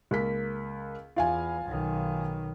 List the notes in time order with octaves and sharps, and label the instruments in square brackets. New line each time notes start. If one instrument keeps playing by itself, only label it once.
[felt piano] C#2 A#3 B6
[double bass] E2 [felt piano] F4 F5 G#5
[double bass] B1 D#3